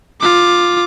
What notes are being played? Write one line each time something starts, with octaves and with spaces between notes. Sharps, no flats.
F4 D6